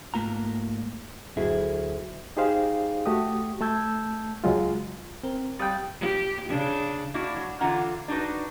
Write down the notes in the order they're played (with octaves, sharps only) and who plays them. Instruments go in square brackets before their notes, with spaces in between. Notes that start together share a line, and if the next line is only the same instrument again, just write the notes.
[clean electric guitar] G#2 A3 A#3 F4 A#5
[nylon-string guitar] D2 E4 G#4 [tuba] F#3
[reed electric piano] D#4 G4 G#4 C5 F5
A3 F#4 G4 D#6
A3 A5 E6 G6 G#6
C#2 F#3 G#3 F4
[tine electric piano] C4 A#4 C5
[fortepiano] G3 G5 [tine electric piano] F5 D#6 A6
[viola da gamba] G4
C#3 D4
[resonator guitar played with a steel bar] A#3 D4 E4 F#4 D5
F#3
D3 E3 F4 F#5 A#5
D4 D#4 F#4 B4